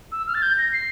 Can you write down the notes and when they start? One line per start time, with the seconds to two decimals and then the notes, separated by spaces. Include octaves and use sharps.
0.12 E6
0.27 F6
0.35 A6
0.42 G6
0.58 A#6
0.73 C7